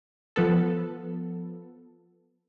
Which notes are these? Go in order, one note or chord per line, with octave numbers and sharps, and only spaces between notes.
F3 B3 A4